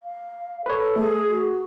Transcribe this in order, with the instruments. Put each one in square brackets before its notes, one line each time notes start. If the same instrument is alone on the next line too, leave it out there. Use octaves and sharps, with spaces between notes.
[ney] F5
[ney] A4 [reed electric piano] B4 C#5
[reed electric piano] A3 [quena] G#4
[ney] F#4